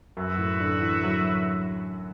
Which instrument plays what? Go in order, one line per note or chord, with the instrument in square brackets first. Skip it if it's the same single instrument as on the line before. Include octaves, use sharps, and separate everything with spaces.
[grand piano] F#2 [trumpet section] F#4 B4 E5
[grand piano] A2
D3
E3
F#3